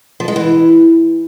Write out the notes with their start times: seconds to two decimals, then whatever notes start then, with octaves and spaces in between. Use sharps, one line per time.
0.20 F3
0.28 G#3
0.36 E3